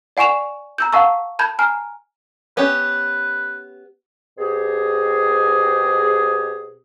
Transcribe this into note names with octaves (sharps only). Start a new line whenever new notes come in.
D5 F#5 G#5 C#6 E7 F7
A#5 E6 G6
F5 F#5 A5 C#6 E6
A5 B5 G6 G#6
G#5 A#5 F6
B3 C#4 G4 B4
B2 C4 G4 G#4